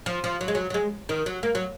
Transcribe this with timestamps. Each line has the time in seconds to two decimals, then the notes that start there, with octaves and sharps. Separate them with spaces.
0.06 F3
0.24 F3
0.41 F#3
0.48 G#3
0.55 F#3
0.70 F#3
0.74 G#3
1.09 D#3
1.26 F#3
1.43 A#3
1.55 F#3